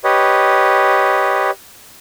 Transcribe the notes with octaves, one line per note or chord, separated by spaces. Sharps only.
G4 B4 C#5 D#5